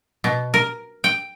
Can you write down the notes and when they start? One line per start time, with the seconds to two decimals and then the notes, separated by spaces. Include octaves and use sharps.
0.24 B2
0.54 A#4
1.04 G5